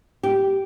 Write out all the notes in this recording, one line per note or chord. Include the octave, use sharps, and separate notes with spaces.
G4